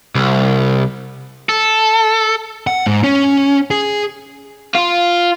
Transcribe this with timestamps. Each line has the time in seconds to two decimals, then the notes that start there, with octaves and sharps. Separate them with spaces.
0.15 C2
1.49 A4
2.67 F#5
2.86 G#2
3.04 C#4
3.71 G#4
4.75 F4